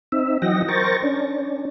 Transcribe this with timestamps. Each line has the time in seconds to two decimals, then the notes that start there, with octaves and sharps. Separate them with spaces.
0.12 C4 D#4 E5
0.42 E3 F#3 D#5 F#5 G5 A#6
0.68 A#4 C5 G5 C#6 A6 A#6
1.02 C#4 D4